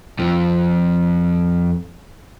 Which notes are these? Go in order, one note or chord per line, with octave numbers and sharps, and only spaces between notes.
F2 F3